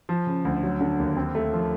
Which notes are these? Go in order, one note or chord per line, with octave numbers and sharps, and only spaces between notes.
F3
C#3
D2
F#3
D3
D#2
C4
A3
F3